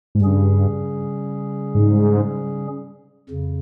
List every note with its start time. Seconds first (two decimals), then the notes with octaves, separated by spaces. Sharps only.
0.15 G#2
0.20 G2 C#3 G3 C#4 G#4
1.75 G#2
3.30 F2 C#3